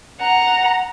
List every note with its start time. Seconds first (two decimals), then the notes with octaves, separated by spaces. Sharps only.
0.21 F#5 A#5